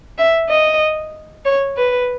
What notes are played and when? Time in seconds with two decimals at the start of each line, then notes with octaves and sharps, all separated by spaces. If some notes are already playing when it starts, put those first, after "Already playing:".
0.18 E5
0.50 D#5
1.45 C#5
1.77 B4